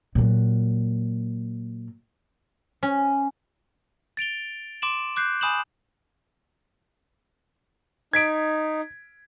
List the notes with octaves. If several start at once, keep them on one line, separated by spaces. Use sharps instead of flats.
A#2 F#3
C#4
A6 D7 F7 G7
C6 D6 D7 E7 F#7
D6 F#6 G6 C7
G#5 B5 D#6 G6 E7 F#7
D#4 G#6 B6 D7